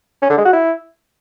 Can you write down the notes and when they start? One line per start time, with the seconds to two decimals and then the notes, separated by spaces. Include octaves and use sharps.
0.22 C#4
0.30 D3
0.37 G#3
0.45 F#4
0.53 E4